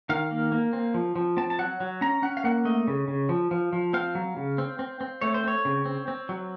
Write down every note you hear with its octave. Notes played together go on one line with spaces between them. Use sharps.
D#3 F5
A#3
A#3
C4
F3
F3
C4 A5
A5
F#3 F#5
F#3
C#4 A#5
C#4 F#5
F5
A#3 F#5
A3 D#5
C#3
C#3
F3
F3
F3
C4 F5
F#3
C#3
C4
C4
C4
A3 C#5
C5
C4 C#5
C#3
C4
C4
F#3